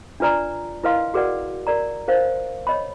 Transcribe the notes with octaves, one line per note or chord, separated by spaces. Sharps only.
D4 F4 B4 D5 A#5
E4 A#4 B4 D#5 F5 C6
F#4 G#4 A#4 B4 D5 F#5
A#4 D5 A#5
A#4 C5 F5
C#5 D#5 B5